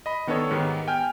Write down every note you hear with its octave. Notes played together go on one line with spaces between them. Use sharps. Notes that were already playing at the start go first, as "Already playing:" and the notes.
D#5 B5
D#3 B3 D4 A4 C#5
G#2 D#3 B3 G4
G5 G#5 F6 G6